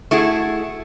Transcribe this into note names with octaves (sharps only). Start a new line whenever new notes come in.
A3 E4 F#4 G#4